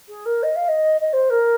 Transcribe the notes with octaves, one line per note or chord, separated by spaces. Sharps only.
G#4
A#4
D#5
F5
D#5
D#5
C5
A#4